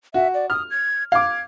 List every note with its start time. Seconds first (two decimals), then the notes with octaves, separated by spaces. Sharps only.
0.14 F#4 E5
0.34 D5
0.50 D#6 F6
0.71 G#6
1.12 F5 D6 G#6